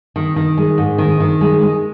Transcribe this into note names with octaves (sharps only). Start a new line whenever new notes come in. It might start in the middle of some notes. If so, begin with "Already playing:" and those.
D#3
D#3
G#3
G#2
D#3
D#3
G#3
G#3